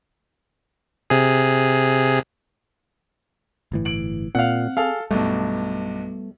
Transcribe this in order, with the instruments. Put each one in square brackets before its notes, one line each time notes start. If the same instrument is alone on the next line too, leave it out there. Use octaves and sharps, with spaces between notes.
[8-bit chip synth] C3 G#4
[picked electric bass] G1 A2 E3
[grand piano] D7 F#7
[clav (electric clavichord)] A#2 [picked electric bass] C4 [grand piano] F5 F#5
[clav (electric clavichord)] G#4 [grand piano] A4 F5
[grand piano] B1 G2 [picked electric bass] G3 B3 [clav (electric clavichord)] A3